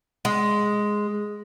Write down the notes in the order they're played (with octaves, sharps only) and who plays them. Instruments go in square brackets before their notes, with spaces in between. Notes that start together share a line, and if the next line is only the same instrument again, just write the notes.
[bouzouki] G#3